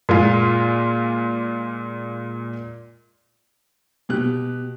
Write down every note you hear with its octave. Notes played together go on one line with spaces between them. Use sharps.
A#2 G#3 F4
B2 G4 F#6